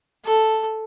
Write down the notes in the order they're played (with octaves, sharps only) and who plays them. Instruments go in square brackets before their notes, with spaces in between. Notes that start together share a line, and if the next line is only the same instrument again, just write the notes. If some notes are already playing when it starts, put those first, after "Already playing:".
[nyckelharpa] A4